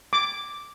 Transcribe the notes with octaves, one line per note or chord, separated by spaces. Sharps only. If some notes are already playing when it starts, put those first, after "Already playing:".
D6